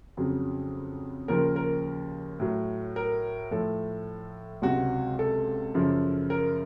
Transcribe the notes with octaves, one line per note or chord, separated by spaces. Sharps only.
F2 C#3 F#3
D#2 C#3 F3 A#4
A#4
A2 F#3
A#4
A2 F3 A4
C#2 C3 F#3 F#4
A4
F#2 C#3 F3
A#4